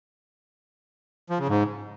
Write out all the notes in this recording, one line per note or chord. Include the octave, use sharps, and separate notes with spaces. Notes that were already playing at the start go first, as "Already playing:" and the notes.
F3
C#3
G#2